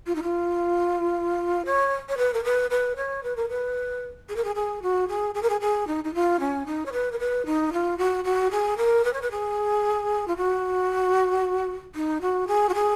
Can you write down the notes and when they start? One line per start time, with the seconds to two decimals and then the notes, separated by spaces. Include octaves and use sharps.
0.06 F4
0.15 D#4
0.23 F4
1.65 C#5
2.09 C#5
2.17 B4
2.34 A#4
2.44 B4
2.70 B4
2.96 C#5
3.23 B4
3.36 A#4
3.49 B4
4.29 G#4
4.36 A#4
4.44 G#4
4.55 G#4
4.82 F#4
5.08 G#4
5.35 G#4
5.43 A#4
5.50 G#4
5.61 G#4
5.87 D#4
6.04 D#4
6.14 F4
6.40 C#4
6.66 D#4
6.86 C#5
6.92 B4
7.12 A#4
7.19 B4
7.46 D#4
7.73 F4
7.98 F#4
8.25 F#4
8.51 G#4
8.77 A#4
9.04 B4
9.13 C#5
9.22 B4
9.31 G#4
10.28 F4
10.37 F#4
11.95 D#4
12.21 F#4
12.47 G#4
12.69 F#4
12.74 G#4